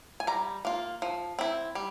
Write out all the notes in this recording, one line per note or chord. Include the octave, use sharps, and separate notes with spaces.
G#5
G3 A#5
A#3 F4
F3
C4 E4
G3